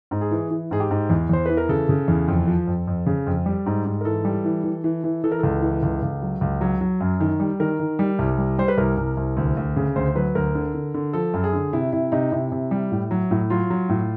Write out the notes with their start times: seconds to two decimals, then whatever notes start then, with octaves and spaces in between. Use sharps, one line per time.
0.11 G#2
0.21 G#4
0.31 E3
0.51 E3
0.71 G#2 G#4
0.80 G4
0.91 G#2
1.10 E2
1.29 E2 C5
1.46 E3 B4
1.57 A#4
1.69 C#3 A4
1.89 C#3
2.08 E2
2.28 F2
2.47 F3
2.67 F2
2.87 F2
3.06 C#3
3.27 F2
3.46 G3
3.66 G#2
3.85 G#2
4.01 A#4
4.05 E3 A4
4.25 G3
4.45 E3
4.64 E3
4.84 E3
5.04 E3
5.24 E3 A4
5.32 A#4
5.39 C#2 A4
5.62 E3
5.83 C#2
6.02 C#2
6.22 F#3
6.41 C#2
6.61 F#3
6.81 F#3
7.01 F#2
7.20 D#3
7.40 G3
7.60 D#3 A#4
7.80 D#3
7.99 G3
8.19 C2
8.38 G3
8.58 G3 C5
8.68 B4
8.77 C2 A#4
8.97 C2
9.17 C2
9.37 D2
9.57 D2
9.76 C#3
9.96 D2 C5
10.16 F#3 B4
10.35 D2 A#4
10.55 D3
10.74 D3
10.94 D3
11.13 F3 A4
11.34 F#2
11.44 G#4
11.53 D3
11.73 C3 E4
11.92 C3 E4
12.12 C3 D#4
12.32 C3 E4
12.52 C3
12.71 G3
12.92 A2
13.11 F#3
13.31 A2
13.50 F#3 F4
13.70 F#3
13.89 A2